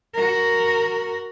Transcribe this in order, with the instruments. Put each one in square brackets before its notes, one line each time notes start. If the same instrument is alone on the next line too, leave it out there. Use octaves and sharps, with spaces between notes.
[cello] F#4 A#4